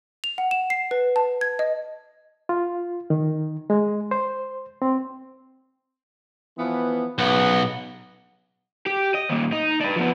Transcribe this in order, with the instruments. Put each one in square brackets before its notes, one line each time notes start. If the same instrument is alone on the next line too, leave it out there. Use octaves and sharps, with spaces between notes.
[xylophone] F7
F#5
E7
C7
B4
A5
G#6
D#5
[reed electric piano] F4
D#3
G#3
C5
C4
[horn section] E3 F3 B3
[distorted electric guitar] B1 [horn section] C#3 B3 F#5
[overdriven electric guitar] G4
D#5
D#2 A#2
D#4
D4 B4
F3 B3